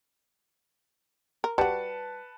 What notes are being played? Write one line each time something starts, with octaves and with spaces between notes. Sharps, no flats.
A#4
G3 F#4 B4 A5 C#7